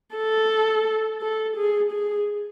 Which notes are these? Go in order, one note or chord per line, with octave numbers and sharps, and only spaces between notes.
A4
A4
G#4
G#4